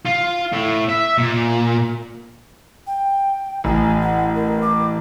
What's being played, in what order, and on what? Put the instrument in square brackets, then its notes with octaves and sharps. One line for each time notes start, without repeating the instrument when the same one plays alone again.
[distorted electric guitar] F4
A2
E5
A#2
[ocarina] G5
[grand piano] A1 [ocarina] G#5
[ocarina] F#5
A#4
D6